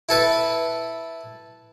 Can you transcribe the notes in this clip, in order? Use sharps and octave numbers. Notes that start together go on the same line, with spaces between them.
E4 A4 B4